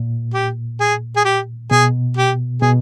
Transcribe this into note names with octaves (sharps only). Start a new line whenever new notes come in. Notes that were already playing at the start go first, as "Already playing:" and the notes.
Already playing: A#2
G4
G#4
G#4
G4
B2 G#4
G4
B2 G#4